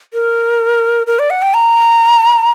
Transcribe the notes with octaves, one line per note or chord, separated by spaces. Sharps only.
A#4
A#4
D5
F#5
G5
A#5